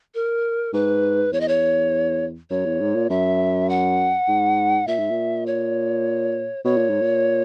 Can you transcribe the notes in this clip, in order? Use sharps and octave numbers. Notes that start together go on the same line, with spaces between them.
A#4
G#2 B4
E2 C#5
D#5
C#5
F#2 C#5
E2
G#2
A#2
F#2 E5
F#5
G#2
A#2 E5
G#2
A#2
C#5
B2 C#5
A#2
G#2
A#2